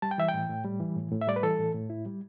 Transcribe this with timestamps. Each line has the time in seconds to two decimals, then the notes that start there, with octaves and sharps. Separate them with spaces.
0.02 G3 A5
0.11 G5
0.18 E3 E5
0.28 G5
0.34 A2
0.49 A2
0.65 G3
0.80 E3
0.96 A2
1.11 A2
1.21 E5
1.27 G3 D5
1.36 B4
1.43 E3 A4
1.59 A2
1.74 A2
1.90 E4
2.06 G3